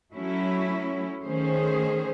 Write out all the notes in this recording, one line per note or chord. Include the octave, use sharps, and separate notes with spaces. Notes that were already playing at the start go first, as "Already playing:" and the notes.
F#3 A3 C#4 E4
D#3 A3 C#4 G#4 C5